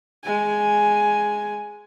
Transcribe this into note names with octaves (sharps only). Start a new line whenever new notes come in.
G#3 G#5